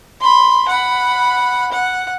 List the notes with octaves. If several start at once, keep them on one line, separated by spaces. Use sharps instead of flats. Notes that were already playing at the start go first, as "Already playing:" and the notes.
B5 C6
F#5 B5
F#5